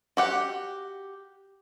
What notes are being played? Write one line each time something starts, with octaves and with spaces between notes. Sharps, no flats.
F#4 G4 F#5